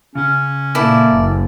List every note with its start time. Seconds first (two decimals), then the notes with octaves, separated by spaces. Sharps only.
0.15 C#3 C#4
0.75 A#2 A#3 E4 A4 D5
1.11 F#1